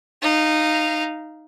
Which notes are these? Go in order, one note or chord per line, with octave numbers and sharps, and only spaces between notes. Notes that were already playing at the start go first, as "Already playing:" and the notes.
D#4 F5